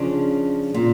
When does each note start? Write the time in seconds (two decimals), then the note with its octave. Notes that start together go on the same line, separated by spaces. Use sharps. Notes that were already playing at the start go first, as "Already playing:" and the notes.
Already playing: C#3 F3 D4
0.74 A#2